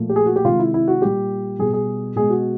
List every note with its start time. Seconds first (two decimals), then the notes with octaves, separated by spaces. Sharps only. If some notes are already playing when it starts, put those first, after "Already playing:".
Already playing: A#2 F3 A3
0.09 G4
0.16 G#4
0.26 F#4
0.36 G4
0.44 C3 D#3 G#3 F4
0.59 E4
0.74 E4
0.88 F#4
1.02 A#2 G3 G4
1.59 B2 G3 G#4
1.73 G#4
2.16 B2 G#3 G#4
2.30 F#4